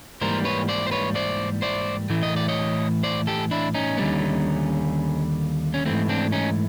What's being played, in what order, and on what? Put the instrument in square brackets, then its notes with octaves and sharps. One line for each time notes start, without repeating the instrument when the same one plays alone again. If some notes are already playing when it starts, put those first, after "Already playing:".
[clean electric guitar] G#2 E3 G3 A#3 A#4 C5
B4 C#5
C5 D5
C5
B4 C#5
C5 D5
C5 D5
A2 E3 A3
D#5
D5
C#5 D#5
C5 D5
G4 A4
D4 E4
C#4 D#4
D#2 D3 G3 B3
C#4
G#2 E3 A3 C4
C4 D4
C#4 D#4